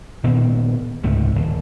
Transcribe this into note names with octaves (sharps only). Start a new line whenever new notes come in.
A#2 D#3 B3 C4
C#2 G#2 C3 A3
D#1